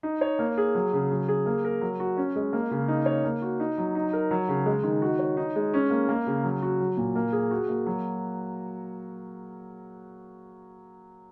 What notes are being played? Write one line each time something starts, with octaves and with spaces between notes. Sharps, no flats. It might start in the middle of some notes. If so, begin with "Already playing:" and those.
D#4
C#5
A#3
G#4
F#3
C#3
F#3
G#4
A#3
A#4
F#3
F#4
C#4
G#3
A#3
C#3
D#4
C#5
A#3
F#4
D#4
F#3
D#4
A#4
F#3
C#3
G#3
D#3
F#4
C#5
D#4
G#3
C#4
A#3
A#3
C#3
F#3
F#4
F#3
A#2
A#3
G#4
F#4
A#3
F#3